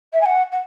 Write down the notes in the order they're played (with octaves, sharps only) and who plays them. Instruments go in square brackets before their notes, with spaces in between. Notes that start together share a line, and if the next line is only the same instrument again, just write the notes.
[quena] E5
G#5
F#5
F#5